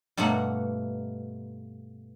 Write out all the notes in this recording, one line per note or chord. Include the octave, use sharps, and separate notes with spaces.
G2 B2 A3 A#3 F#5